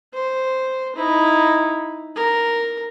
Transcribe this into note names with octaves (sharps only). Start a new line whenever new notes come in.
C5
D#4 E4
A#4